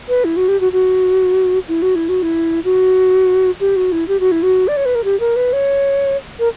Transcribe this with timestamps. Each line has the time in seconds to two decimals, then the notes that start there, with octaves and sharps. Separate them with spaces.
0.09 B4
0.25 E4
0.37 F#4
0.48 G4
0.61 F#4
0.72 F#4
1.68 E4
1.82 F#4
1.95 E4
2.09 F#4
2.22 E4
2.65 F#4
3.60 G4
3.76 F#4
3.92 E4
4.08 G4
4.20 F#4
4.32 E4
4.43 F#4
4.68 D5
4.77 C#5
4.86 B4
4.95 A#4
5.04 G4
5.20 A#4
5.36 B4
5.53 C#5
6.39 A#4